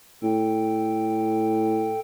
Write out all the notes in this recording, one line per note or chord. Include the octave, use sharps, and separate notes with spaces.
A2 A4 G5